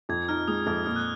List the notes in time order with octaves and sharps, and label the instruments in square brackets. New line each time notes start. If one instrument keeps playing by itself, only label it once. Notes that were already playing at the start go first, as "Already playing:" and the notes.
[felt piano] F2 [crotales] G#6
[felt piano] D#4 [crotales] F6
[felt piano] G#3 [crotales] D#6
[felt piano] F2 [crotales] F6
[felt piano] A#2 [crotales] F6
[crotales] F#6